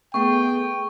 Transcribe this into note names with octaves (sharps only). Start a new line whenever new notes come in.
A3 B3 G#4 G5 C#6